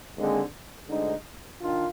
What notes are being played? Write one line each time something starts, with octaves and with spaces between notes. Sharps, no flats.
D#2 D3 G#3 C4
D2 D3 G#3 D#4
D#3 D4 F4